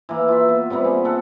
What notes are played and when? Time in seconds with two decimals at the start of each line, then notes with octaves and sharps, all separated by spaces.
0.09 E3 A#3
0.29 F4 E5
0.49 B3
0.70 C3 G3 A#3 B3
0.85 G#4
1.05 A4 F#5